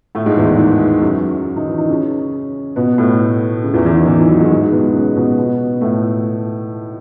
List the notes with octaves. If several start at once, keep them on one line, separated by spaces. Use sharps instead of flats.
A2 A3
G#2 G#3
E2 E3
D#3
D#3
F#2 F#3
D#3 D#4
E3 E4
D#3 D#4
C#3 C#4
B2 B3
A2 A3
C#3
E2 E3
E2 E3
D#3
E2 E3
D#3
F#2 F#3
G#2 G#3
G#2 G#3
B2 B3
C#3 C#4
B2 B3
B2 B3
A2 A3